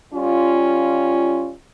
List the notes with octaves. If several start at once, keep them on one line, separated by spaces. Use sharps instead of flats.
G3 C#4 F4